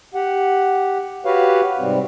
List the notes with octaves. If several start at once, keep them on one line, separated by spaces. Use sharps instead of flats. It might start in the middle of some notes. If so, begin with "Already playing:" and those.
G4 F#5
F#4 G4 B4 C#5 F5
G#2 C3 G3 C4